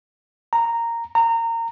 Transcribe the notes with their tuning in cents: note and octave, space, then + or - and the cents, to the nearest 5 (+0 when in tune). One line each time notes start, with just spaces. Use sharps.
A#5 -10
A#5 -25